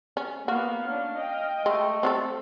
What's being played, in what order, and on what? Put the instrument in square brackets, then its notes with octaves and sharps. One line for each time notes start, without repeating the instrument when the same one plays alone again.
[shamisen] C#4
[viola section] A#3 B3 [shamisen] F#4 [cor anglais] F5
[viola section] C#4 D4 [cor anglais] F5
[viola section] D#5 G5
[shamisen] G#3 [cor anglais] A3
[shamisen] C4 G4 A4